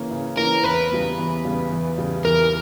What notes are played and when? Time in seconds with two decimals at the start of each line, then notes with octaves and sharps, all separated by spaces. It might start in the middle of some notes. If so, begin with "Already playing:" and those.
Already playing: C#3 E3 A#3 C#4
0.11 C#3
0.37 E3 A#3 C#4 A#4
0.64 E2 B4
0.91 C#3 G3 B3
1.18 E2
1.45 C#3 G3 B3
1.71 E2
1.98 C#3 G3
2.25 E2 A#4